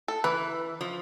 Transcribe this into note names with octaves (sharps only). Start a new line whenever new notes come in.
A4
E3 B4
F3